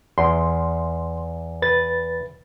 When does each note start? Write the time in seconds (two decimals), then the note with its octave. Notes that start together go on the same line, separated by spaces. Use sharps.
0.18 E2 C6
1.62 B4 A6